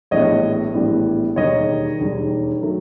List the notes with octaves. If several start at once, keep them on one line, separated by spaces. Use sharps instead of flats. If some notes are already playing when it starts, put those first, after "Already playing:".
A#1 A2 E3 G3 B3 C#5 D#5
A#1 A2 E3 G3 B3
E1 D#2 D#3 G3 C#5 D#5
E1 D#2 D#3 G3
D#3 F#3 A3